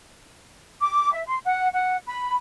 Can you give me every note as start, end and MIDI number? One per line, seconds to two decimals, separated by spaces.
0.81 1.12 86
1.14 1.23 76
1.26 1.38 84
1.45 1.68 78
1.72 1.98 78
2.07 2.35 83